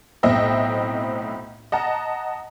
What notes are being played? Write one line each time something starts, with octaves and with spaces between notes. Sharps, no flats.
B1 A2 C4 D#5 E5 G5
D#5 F#5 A5 A#5